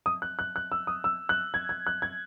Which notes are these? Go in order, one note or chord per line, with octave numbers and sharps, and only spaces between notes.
D#6
F#6
F#6
F#6
E6
D#6
E6
F#6
G#6
G#6
F#6
G#6